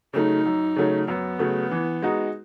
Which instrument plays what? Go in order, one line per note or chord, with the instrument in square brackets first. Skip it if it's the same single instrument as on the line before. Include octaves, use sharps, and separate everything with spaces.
[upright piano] C#3 F#3 A3 [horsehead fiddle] D#4
[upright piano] F#2
C#3 F#3 A3
[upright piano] F#2 [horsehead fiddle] B3
[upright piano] C#3 F#3 A3
E3
G#3 D#4 F#4